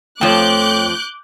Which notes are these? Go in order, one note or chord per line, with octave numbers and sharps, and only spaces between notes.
F2 F3 A3 C#5 G5 D6 F#6 G6